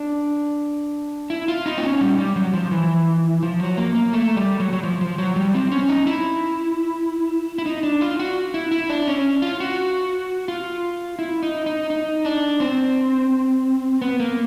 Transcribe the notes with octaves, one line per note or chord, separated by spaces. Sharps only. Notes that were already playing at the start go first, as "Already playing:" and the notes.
Already playing: D4
E4
F4
D#4
C4
C#4
G3
G3
F#3
F3
E3
F3
F#3
A#3
A#3
A3
G3
F#3
F#3
F3
F3
F#3
G3
C4
C#4
D#4
E4
E4
D#4
D4
F4
F#4
E4
E4
D4
C#4
F4
F#4
F4
E4
D#4
D#4
D#4
D4
C4
B3
A#3